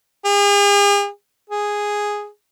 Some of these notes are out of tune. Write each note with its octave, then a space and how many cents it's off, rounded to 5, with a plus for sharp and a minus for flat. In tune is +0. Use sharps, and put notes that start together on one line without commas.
G#4 -45
G#4 -5